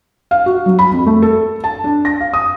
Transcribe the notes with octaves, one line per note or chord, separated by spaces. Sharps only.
F5
F#4
F#3
B5
F2
A3
A4
A5
D4
A#6
F5
D#6